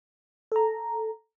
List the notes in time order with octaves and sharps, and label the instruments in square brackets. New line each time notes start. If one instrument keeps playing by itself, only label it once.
[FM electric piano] A4 A#5